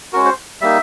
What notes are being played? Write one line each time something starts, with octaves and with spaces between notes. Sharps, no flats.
G#3 C#4 F#4 A#4
C5
G3 A#3 D#4 E5